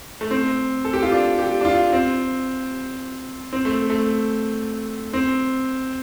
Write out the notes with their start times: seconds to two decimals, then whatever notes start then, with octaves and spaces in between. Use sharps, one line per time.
0.21 A3
0.31 C4
0.85 A4
0.93 G4
1.03 F4
1.12 D4
1.39 G4
1.61 D4
1.65 F4
1.92 C4
3.53 C4
3.65 A3
3.90 A3
5.13 C4